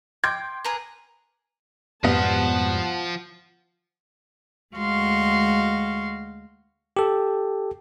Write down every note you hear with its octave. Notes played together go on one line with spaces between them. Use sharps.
G5 C6 D6 G#6
G#4 A#4 B4
F2 G#2 B2 F3 G3 B3 F#5 A5
D2 G#3 F#4 F5 C6 C#6
G4 A4